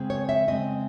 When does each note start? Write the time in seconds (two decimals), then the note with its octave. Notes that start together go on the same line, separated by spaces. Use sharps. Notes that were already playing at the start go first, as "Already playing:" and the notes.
Already playing: C#3 G#3 C4
0.10 C#5
0.29 E5
0.48 C#3 G#3 C4 D#5